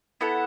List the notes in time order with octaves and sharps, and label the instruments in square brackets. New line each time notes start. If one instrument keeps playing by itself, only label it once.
[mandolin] B3 E4 A4 F#5